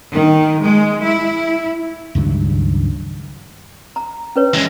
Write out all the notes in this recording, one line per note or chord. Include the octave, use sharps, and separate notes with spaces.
D#3
G#3
E4
C#2 G2 D#3 F#3
A#5
C#4 B4 C#5
E3 G#3